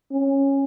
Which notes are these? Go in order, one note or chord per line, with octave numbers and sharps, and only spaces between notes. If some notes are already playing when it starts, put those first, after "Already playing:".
C#4